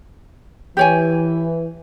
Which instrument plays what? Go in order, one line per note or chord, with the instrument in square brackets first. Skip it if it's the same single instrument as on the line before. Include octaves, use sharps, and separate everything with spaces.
[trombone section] E3 [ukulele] G4 C#5 G#5